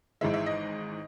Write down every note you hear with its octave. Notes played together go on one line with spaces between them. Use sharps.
G#1 G#2 E3 G#3 E5
E5
D#5